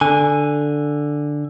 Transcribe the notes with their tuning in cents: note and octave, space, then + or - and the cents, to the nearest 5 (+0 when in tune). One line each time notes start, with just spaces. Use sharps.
D3 +5 G#5 +0